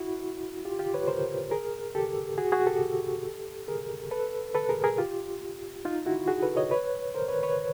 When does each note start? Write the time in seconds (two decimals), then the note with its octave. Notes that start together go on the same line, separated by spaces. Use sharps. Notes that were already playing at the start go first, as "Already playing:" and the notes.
Already playing: E4 F#4
0.65 F4 G4
0.79 F4 G4
0.94 B4 C#5
1.08 A#4 C5
1.51 G#4 A#4
1.95 G4 A4
2.38 F#4 G#4
2.52 F#4 G#4
2.67 G4 A4
3.68 G#4 A#4
4.11 A4 B4
4.55 A4 B4
4.69 G#4 A#4
4.84 G#4 A#4
4.98 F4 G4
5.85 D#4 F4
6.06 E4 F#4
6.27 F#4 G#4
6.42 A4 B4
6.56 C#5 D#5
6.71 B4 C#5
7.15 A#4 C5
7.28 B4 C#5
7.43 B4 C#5